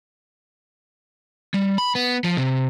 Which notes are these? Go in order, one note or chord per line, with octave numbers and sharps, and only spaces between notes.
G3
B5
B3
F3
C3